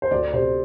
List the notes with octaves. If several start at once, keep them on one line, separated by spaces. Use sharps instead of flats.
C5
D2 D5
C3 C5